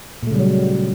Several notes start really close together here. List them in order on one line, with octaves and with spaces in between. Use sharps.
A#2 A3 C#3 G3 F#3